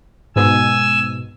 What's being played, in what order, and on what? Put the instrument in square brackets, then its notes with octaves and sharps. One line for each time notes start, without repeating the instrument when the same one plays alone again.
[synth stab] G#2 B2 [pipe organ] G#5 E6